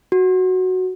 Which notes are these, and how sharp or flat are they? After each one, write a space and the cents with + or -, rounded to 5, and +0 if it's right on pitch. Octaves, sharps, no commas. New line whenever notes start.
F#4 +0